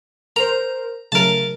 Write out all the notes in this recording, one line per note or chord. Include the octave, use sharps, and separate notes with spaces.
A#4 C5 A#5
C#3 F#3 A3 A#4 A5